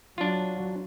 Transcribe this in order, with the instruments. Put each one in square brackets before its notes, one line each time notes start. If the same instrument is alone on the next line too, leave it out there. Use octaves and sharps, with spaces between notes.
[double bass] F#3 [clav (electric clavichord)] D4 F4